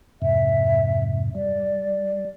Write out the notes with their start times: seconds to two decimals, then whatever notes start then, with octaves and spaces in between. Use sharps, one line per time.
0.22 F2 G#2 C3 E5
1.35 G3 D5